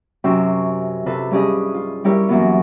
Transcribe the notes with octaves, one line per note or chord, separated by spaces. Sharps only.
F#2 C3 C#4 G5 C6 E6
C3 F4 A4 B4
G2 C#4 G4 G#4 D#5
F4
G3 E4 G4 A#4 C#5 E5
F#2 E3 F#3 A#3 B3 F4